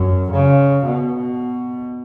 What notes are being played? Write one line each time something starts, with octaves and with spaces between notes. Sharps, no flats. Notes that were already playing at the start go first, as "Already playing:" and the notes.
Already playing: F#2
C#3
B2